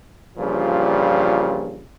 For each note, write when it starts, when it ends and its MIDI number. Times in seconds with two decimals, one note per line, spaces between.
0.37 1.84 43
0.37 1.84 46
0.37 1.84 49
0.37 1.84 52
0.37 1.84 53
0.37 1.84 55